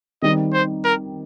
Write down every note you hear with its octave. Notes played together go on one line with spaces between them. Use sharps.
D#3 G3 C4 D#4 D#5
C5
A#4